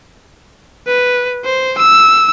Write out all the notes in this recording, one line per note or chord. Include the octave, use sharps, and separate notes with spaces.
B4
C5
E6